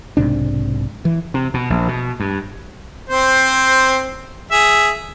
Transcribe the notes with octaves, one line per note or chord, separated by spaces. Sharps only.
B1 G#2 C3 D4
E3
C3
B2
A#1
B2
G2
C4 C5
G#4 E5